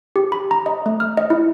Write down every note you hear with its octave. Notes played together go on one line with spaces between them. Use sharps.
G4
B5
A#5
D#5
A3
F6
D#5
E4